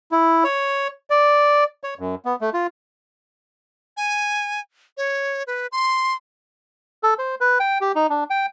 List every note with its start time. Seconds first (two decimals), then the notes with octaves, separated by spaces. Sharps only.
0.12 E4
0.44 C#5
1.10 D5
1.84 C#5
1.99 F#2
2.25 B3
2.41 A3
2.54 F4
3.97 G#5
4.97 C#5
5.47 B4
5.72 C6
7.03 A4
7.19 C5
7.41 B4
7.60 G5
7.81 G4
7.95 D#4
8.10 D4
8.30 G5